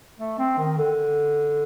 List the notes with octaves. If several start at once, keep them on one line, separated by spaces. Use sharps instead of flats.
A3
C4
D#3
D3